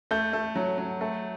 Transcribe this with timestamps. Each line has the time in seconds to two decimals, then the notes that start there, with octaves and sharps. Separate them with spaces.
0.11 A3 G6
0.33 A3
0.56 F#3
0.78 F#3
1.01 A3